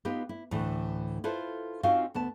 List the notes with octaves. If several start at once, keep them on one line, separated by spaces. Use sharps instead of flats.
B3 D#4 F4 G4 B4
E4
D2 A2 E3
E4 F4 A4 B4 C5
C4 C#4 D#4 F4 F#4 F5
D2 B3 A5